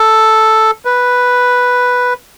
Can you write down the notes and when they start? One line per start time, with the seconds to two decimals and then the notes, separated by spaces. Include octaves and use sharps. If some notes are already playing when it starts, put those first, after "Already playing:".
Already playing: A4
0.85 B4